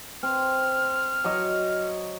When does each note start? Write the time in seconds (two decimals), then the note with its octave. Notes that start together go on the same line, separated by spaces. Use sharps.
0.23 C4 F6
1.24 F#3 C#5 D#5